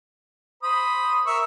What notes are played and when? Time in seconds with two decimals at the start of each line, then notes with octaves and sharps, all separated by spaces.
0.63 C5 B5 D#6
1.26 A#4 E5 C#6